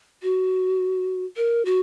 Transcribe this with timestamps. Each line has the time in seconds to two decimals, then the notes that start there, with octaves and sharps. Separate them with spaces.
0.23 F#4
1.37 A#4
1.66 F#4